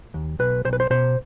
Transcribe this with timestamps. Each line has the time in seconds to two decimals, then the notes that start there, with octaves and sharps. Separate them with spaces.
0.14 D#2
0.39 B1 B4
0.65 B1 C5
0.73 B4
0.80 C5
0.90 B2 C5